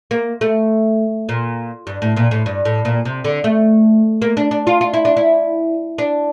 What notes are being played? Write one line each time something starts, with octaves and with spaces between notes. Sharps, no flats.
A#3
A3
A#2
G2
A2
A#2
A2
G2
A2
A#2
C3
D3
A3
A#3
D4
D4
F4
F4
E4
D4
E4
D4